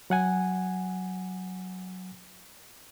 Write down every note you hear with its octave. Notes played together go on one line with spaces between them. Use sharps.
F#3 F#5 G#5